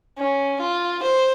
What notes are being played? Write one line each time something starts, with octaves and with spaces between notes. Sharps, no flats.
C#4
F4
C5